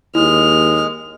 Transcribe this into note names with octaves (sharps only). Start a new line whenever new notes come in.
D#2 G#3 E4 F6